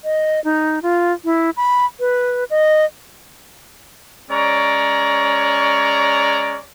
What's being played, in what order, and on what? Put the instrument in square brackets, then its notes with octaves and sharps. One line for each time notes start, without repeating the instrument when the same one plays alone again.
[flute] D#5
D#4
F4
E4
B5
B4
D#5
[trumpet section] G#3 C#4 C#5 D5 A#5